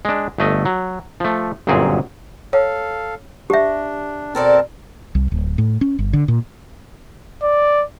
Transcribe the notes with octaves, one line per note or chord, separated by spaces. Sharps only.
G#3 D4
G1 A3 D#5
F#3
F3 A3
G1 F#2 A#2 C4 G#4
A4 C#5 F5
D4 G4 E5
B2 C4 A4 A#4 D5 A5
C2
D1
A2
C#4
G1
D3
A#2
D5